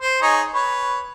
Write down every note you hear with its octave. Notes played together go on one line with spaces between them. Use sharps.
C5
D#4 G#4 C#5
B4 C#5